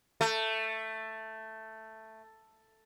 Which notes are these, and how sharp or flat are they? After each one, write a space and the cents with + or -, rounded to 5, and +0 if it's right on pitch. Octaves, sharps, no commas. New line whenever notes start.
A3 +5